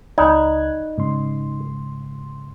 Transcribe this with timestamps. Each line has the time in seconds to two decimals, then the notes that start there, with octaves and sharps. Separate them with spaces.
0.18 C#2 D#4 D5 G#5 B5 F#6 G#6
0.98 G#2 C#3 C6